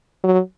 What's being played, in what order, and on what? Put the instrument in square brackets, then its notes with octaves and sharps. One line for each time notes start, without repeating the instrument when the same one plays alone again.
[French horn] F#3